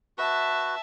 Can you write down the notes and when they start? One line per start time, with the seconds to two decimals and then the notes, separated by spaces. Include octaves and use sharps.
0.18 F#4 B4 E5 A5